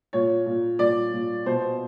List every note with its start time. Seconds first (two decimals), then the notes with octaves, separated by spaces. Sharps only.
0.13 A#2 C#5
0.46 A#2
0.79 A#2 D5
1.13 A#2
1.46 B2 C5